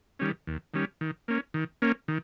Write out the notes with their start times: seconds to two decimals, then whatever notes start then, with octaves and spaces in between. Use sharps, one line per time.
0.19 D#3 G3 C#4
0.47 D#2
0.74 D#3 G3 C#4
1.01 D#3
1.28 A#3 C#4
1.54 D#3
1.82 A#3 C#4
2.08 D#3